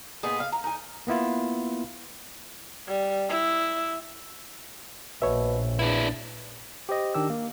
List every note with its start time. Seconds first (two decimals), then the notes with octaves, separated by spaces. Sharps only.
0.23 A#2 B3 D#4 G#4
0.40 F5
0.52 A#5
0.64 D#4 G#5
1.07 A#3 B3 E4 F4
2.88 G3
3.29 E4
5.22 A#1 B2 C#5 E5
5.79 E2 D4 E4
6.89 G4 C5 D#5
7.14 D#3 D4 G4 E6
7.30 A#3